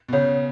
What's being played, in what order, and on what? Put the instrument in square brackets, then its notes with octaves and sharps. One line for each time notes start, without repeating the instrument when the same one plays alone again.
[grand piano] B2
[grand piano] C#3 [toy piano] C#5 F#5 B5